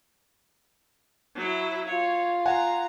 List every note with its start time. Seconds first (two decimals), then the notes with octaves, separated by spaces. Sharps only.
1.35 F#3 E4
1.88 F4 C#5
2.46 F#5 G#5 A#5